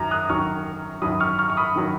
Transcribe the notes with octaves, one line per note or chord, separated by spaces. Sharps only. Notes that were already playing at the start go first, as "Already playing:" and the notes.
Already playing: F#2 D#3 F#3 A#5
D#6 F#6
F#2 D#3 F#3 C#6 F6
F#2 D#3 F#3 B5 D#6
C#6 F6
C#6 F6
C#6
B5 D#6
D#3 F#3